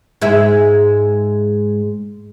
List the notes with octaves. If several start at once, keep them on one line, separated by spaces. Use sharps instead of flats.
G#2 G#3 E5